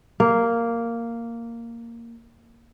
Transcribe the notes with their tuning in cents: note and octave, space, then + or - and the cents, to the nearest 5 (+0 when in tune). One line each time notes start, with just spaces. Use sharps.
A#3 -5